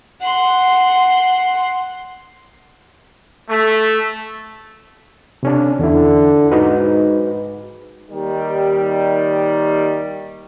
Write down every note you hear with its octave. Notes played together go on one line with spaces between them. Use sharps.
F#5 C6
A3
C3 C#4 D4
E2 D3 E4
G#2 D#4 F#4 B4
D#2 D#3 G3